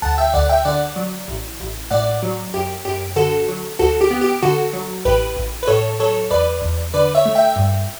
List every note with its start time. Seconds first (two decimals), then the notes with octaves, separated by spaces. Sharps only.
0.02 D2 F#5 A5
0.18 E5 G5
0.34 D2 D5 F#5
0.49 E5 G5
0.65 D3 D5 F#5
0.96 F#3
1.28 A1
1.60 A1
1.90 A2 D5 F#5
2.23 F#3
2.54 F#2 G4
2.85 F#2 G4
3.16 D3 F#4 A4
3.48 F#3
3.79 D2 F#4 A4
4.01 G4
4.11 B3
4.21 G4
4.42 D3 F#4 A4
4.73 F#3
5.05 A1 G4 B4
5.37 A1
5.63 B4
5.67 A2 A4 C#5
5.99 F#3 A4 C#5
6.31 E2 B4 D5
6.62 E2
6.94 D3 B4 D5
7.15 C#5 E5
7.26 A3
7.35 E5 G5
7.56 G2